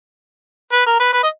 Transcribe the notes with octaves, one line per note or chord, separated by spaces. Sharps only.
B4
A#4
B4
B4
D#5